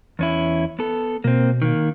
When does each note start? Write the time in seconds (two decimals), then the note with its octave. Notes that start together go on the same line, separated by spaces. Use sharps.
0.19 E2 C#4 E4
0.79 B3 A4
1.24 B2 A#3 C4
1.62 D#3 A#3